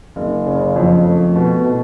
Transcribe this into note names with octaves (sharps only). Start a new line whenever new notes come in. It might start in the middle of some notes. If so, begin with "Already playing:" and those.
F#1
C#3
F2
A3
B2
B2